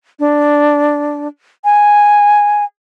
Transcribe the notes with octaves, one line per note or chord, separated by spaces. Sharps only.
D4
G#5